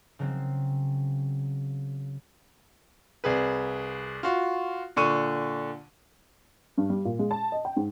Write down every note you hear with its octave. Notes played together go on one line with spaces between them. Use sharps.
C#3 F#3 C4
C2 G#4 B4
F4 F#4
A#2 D3 C#6 D#7
G2
G3
A#2
G#3
A5
D#5
G5
G#2